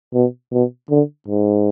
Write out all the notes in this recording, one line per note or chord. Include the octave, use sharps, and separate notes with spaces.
B2
B2
D3
G#2